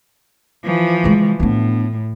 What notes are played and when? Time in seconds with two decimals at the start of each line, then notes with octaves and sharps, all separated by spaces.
0.64 E3 F3
1.04 C#3 G#3
1.40 A2 B3 D4